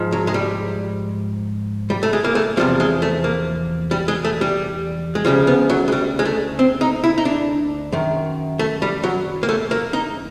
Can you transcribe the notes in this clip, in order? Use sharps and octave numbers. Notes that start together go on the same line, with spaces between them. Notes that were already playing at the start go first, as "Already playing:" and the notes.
Already playing: G#2 F3
F#3
G#3
G3
G3
A3
G#3
A#3
A3
E2 C3 F3 G3
G#3
A3
A#3
G3
G#3
A3
G3
G#3
D2 C#3 F3 G3
B3
F#3
G#3
G3
G#3
A3
C4
D#4
E4
D#4
D4
F#2 D#3
A3
G3
F#3
A#3
A3
A#3
D#4